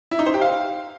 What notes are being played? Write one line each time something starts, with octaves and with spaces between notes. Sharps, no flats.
E4
D#4
C5
G4
F5